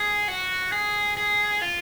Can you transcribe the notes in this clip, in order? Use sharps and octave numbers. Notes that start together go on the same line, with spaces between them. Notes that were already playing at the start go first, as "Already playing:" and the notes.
Already playing: G#4
F#4
G#4
G#4
F4